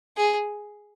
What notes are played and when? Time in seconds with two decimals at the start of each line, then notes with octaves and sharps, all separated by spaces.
0.17 G#4